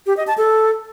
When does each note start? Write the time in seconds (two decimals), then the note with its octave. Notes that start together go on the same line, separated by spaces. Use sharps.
0.07 G4
0.17 D#5
0.27 A5
0.38 A4